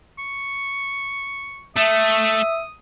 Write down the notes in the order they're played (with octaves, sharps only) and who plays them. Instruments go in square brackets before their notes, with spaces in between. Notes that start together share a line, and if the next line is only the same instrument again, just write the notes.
[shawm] C#6
[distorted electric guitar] A3 [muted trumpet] E5 [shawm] D#6